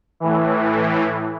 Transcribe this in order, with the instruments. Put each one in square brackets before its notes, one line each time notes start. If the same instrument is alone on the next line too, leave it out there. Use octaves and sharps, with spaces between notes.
[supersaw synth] A2 E3